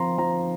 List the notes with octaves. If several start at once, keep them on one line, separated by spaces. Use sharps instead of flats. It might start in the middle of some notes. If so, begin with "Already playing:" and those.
Already playing: F3 C4 A#5 C6
F3 A#5